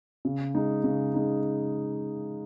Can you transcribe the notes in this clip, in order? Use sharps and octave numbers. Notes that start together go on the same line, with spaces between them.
C#3
G#3 D#4
C#3
G#3 D#4